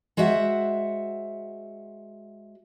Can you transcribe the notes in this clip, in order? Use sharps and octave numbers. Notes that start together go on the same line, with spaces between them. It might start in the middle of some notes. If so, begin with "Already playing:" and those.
G#3 F#4 C5 E5 F#5